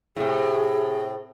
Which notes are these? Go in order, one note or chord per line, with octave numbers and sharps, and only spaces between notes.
A2 C3 G#4